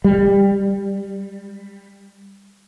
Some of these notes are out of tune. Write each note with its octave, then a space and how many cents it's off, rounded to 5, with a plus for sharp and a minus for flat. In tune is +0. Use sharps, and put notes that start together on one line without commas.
G3 +15